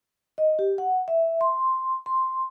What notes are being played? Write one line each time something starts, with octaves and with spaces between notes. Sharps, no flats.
D#5
G4
F#5
E5
C6
C6